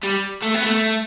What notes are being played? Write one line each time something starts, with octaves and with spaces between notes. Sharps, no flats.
G3
A3
B3
A3